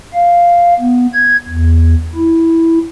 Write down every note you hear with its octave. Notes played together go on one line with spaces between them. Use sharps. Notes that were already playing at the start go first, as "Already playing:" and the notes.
F5
B3
G#6
E2
E4